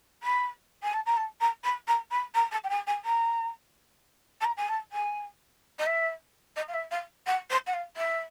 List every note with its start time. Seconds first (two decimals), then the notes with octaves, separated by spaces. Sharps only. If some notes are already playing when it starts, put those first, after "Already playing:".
0.23 B5
0.82 G#5
0.93 A5
1.05 A#5
1.16 A5
1.40 A#5
1.63 B5
1.87 A#5
2.11 B5
2.34 A#5
2.51 A5
2.64 G5
2.69 G#5
2.87 G#5
3.04 A#5
4.40 A5
4.44 A#5
4.57 G#5
4.68 A5
4.92 G#5
5.78 D#5
5.86 E5
6.56 D#5
6.68 F5
6.73 E5
6.91 F5
7.26 F#5
7.50 C5
7.66 F#5
7.73 F5
7.96 E5